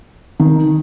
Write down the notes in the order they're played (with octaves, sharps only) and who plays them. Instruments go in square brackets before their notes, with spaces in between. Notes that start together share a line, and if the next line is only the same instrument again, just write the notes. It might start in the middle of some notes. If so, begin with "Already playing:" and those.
[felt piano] D#3